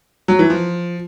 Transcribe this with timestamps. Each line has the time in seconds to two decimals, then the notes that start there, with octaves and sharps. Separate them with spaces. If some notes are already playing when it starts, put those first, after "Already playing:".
0.28 F#3
0.39 E3
0.50 F3